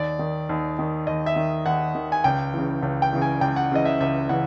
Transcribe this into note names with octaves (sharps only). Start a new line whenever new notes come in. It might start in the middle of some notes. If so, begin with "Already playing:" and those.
Already playing: D#2 D5
D#3
D#2
D#3
D#2 D#5
E5
D#3
D#2 F#5
D#3
G#5
C#2 G5
C#3 E3
C#2
G5
C#3 E3
G#5
C#2 G5
F#5
C#3 E3 D#5
E5
C#2 E5
C#3 E3 F#5